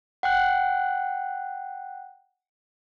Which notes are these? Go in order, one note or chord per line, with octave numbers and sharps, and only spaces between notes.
F#5 G5 F#6